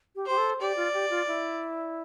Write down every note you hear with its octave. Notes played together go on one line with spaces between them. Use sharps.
G4
G4 C5
A4
G4 D5
F4
G4
F4
E4